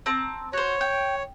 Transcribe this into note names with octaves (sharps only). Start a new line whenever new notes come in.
C4 A5 A#5
F#4 C5 C#5
G5